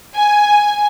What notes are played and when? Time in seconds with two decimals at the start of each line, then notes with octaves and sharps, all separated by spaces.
0.15 G#5